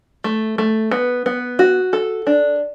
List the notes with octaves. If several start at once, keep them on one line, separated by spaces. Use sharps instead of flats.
A3
A3
B3
B3
F#4
A4
D4